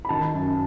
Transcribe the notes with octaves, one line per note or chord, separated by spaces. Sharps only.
B5
D#3 A5
F#2